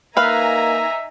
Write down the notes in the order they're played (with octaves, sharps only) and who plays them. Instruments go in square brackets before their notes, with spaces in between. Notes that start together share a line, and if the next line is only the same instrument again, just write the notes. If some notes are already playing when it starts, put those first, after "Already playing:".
[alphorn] A#3 [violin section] D#4 G#5 A#5 [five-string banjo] B4 F5 [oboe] E5